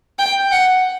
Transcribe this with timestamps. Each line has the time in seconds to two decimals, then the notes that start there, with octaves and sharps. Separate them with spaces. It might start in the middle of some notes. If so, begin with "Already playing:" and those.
0.19 G5
0.52 F#5